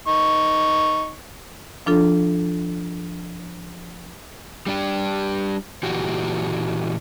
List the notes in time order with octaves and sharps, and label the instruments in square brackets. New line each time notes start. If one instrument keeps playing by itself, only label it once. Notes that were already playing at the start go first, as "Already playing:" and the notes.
[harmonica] D#4 C#6
[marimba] F3 D4 F4 A4
[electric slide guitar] G3 D4 G4
A#2 E3 F#4 G4